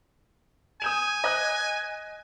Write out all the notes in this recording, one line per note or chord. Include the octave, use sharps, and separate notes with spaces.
G#5 D#6 G6 E7
D#5 F#6